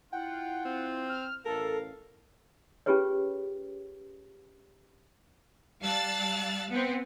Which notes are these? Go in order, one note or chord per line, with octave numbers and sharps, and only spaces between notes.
E4 F4 F#5 G5
C4
F6
A1 A4 A#4 F5
C#4 F4 G4 G#4 B4 C#5
G3 F5 A5 E6 F#6 A6
B3 C4